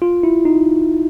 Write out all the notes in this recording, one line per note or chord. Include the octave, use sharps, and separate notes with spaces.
F4
E4
D#4